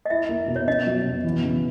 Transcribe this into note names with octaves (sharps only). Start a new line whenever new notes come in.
D#5
E4 E5
A#3
B2
C#5
C#4 D#5
F#3
B2
E3
C#3